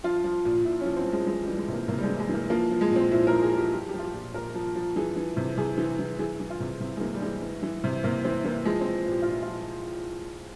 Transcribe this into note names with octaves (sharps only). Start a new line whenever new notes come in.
F3 F4
F3
A#2
A#2 E4
F3 C#4
C4
F3
G#3
E3 G#3
E3 G3
G#3
C3
A#3
C3 A#3
G3
G#3
E3
G#3
E3 A#3
F3 A#3
F3
G#3
A#2
C4
A#2 E4
F3 A#4
G#4
F3 G4
F3 G4
F3 G4
F4
G4
A#2
A#2 A#4
F3
F3
E3 G#4
E3
C3
C3 G#4
E3
E3
E3 G#4
E3
F4
C3
C3 E4
G#3
E3 A#3
G3
E3 G#3
E3
E3
C3
C3 A#3
E3 C4
E3 A#3
F3 G#3
F3 C4
A#2
G4
A#2 F4
E4
F4
F3